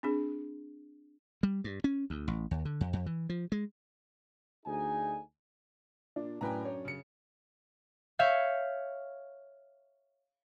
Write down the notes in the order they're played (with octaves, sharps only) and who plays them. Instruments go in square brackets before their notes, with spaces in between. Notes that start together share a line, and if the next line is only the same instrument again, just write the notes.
[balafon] C4 D4 G#4
[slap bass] G3
G2
C#4
D2
A1
D#2
D3
F2
F2
E3
F3
G#3
[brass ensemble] D2 D#4 G#4 G#5
[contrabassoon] A#2 [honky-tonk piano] D4
[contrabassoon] F#2 [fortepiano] A2 B4 [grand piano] G5 G#5 A#5
[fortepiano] C#5
[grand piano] C#3 C#7
[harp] C#5 E5 F5 G6